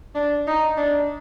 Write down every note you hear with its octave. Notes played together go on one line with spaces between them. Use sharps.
D4
D#4
D4